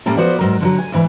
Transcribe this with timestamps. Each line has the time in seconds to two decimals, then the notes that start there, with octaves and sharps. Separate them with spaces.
0.06 A2 G3 A#3 C#4 A4
0.17 F3 B3 F#4 C5 D5
0.39 G#2 F#3 A#4
0.60 D3 F3 F#3
0.79 G#5
0.92 D2 G#2 E3